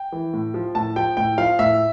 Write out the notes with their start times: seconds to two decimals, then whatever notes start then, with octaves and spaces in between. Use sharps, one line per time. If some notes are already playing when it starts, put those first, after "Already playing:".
Already playing: G5
0.12 E3
0.33 A2
0.54 F3
0.75 A2 A5
0.96 F3 G5
1.17 A2 G5
1.38 F3 F5
1.59 A2 E5